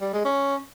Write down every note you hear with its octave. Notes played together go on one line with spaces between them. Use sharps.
G3
G#3
C#4